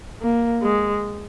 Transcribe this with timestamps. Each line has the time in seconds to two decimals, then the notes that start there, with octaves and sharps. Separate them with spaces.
0.21 A#3
0.62 G#3